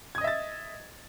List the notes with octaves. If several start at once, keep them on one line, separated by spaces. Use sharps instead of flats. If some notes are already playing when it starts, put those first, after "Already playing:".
D#5 E5 D#6 G#6 A6